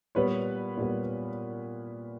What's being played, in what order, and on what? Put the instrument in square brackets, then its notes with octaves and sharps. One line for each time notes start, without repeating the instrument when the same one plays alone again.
[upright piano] A#2 G3 B3 B4 C#5
A#2 G3 B3